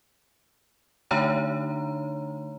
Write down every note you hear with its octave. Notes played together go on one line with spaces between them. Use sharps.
D3 A3 D4 D#4 C#5 A#5